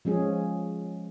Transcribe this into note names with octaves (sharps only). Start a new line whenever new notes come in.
F3 G#3 C#4 G#4